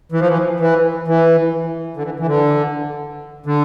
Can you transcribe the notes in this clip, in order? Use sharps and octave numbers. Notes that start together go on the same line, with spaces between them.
E3
F3
E3
E3
E3
D3
E3
E3
D3
D3